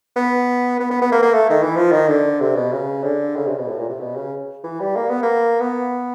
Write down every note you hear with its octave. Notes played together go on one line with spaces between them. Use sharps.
B3
B3
B3
B3
A#3
A#3
A3
D#3
E3
F3
D#3
D3
C3
B2
C#3
D3
C#3
C3
B2
A2
A#2
C3
B2
C#3
E3
G3
A#3
B3
A#3
B3